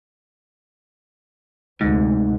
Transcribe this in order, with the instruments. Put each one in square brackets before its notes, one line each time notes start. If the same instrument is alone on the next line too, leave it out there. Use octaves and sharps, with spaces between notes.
[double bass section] D2 C3 [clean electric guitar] G#2